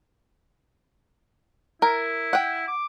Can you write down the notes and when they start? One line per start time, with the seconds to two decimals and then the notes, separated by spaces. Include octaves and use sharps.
1.82 E4 A#4
2.33 F#5 G5
2.68 D6